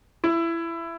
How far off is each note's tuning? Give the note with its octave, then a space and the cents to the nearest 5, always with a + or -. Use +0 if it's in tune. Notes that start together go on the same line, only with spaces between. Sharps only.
E4 +20